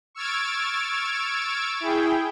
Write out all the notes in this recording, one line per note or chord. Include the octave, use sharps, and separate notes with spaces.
C#6 E6 F6 G#6 A6 D7
E4 G#4 G5